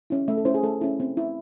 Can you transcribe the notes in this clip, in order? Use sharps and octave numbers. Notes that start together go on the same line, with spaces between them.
C#4 E4
A3 E5
A4
C#4 E4 C5
G#4
A3 A4
C#4 E4
C4
E4